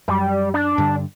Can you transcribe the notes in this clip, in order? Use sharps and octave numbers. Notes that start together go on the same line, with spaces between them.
F#2 G3
D4
G2 D3